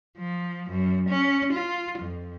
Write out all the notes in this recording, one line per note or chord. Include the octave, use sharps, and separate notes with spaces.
F3
F#2
C#4
F4
F2